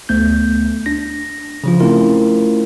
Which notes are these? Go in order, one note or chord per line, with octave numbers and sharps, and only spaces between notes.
D2 A3 B3 G6
D4 A#6
C#3 F3 F4
A3 C4 C#4 E4 F4 A#4